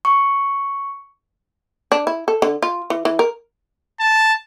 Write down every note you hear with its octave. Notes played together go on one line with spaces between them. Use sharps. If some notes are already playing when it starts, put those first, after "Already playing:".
C#6
D4
E4
A4
D3
F4
E3
E3
A#4
A5